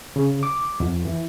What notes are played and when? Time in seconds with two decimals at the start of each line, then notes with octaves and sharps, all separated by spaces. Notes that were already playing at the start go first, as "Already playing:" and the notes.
0.16 C#3
0.43 D6
0.80 F2
1.05 E3